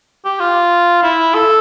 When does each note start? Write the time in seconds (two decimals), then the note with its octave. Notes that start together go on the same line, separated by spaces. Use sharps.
0.25 G4
0.40 F4
1.03 E4
1.35 A4